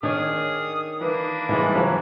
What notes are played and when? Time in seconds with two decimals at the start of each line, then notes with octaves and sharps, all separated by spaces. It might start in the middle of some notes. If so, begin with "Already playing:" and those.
0.03 D#3 D4 G#4 C#5 D#6 F6
1.01 E3 A#3 D4 B4
1.49 G#2 E3 G3 G#3
1.75 C#3 F3 F#3